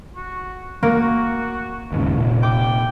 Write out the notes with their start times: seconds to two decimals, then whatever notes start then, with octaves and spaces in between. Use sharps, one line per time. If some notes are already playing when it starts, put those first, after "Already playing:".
0.16 F#4
0.83 A#3 F#4
1.92 D#2 G#2 C#3
2.17 F1 A#2
2.43 G5 D6